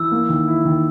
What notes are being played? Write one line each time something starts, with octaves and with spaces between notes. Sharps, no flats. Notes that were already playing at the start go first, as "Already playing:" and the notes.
Already playing: E3 E6
A#3
D#3
E4
D#3